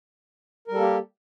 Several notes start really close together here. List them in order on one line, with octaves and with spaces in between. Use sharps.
A#4 G3 A4 A#3 G4